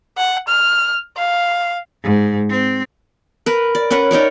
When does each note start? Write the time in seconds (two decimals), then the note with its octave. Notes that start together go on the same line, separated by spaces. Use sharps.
0.17 F#5
0.48 F6
1.17 F5
2.04 G#2
2.49 C4
3.46 A#4 B4
3.75 D5
3.90 C#4 A#4 B4 F#5
4.11 D#4 A#4 C#5 D5